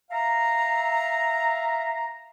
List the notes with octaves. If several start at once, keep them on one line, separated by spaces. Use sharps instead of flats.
E5 F5 A#5